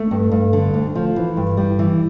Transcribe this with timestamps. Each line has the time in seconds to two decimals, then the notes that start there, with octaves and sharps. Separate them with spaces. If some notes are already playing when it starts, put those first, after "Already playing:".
Already playing: A3
0.11 G2
0.31 G2
0.53 D3
0.74 D2
0.95 F3
1.16 E3
1.37 G2
1.57 G3
1.79 E3